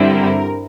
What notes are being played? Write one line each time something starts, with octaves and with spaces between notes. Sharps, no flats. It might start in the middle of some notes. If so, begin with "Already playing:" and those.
Already playing: G2 D3 G3 C4 E4
A#4